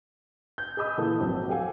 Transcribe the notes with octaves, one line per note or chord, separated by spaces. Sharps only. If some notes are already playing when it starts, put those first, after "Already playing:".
G6
G#4 D#5 B5 D#6 E6
A#2 E3 A#3 A4 A5
G#1 F2 F#3
G4 A4 F5 F#5 G#5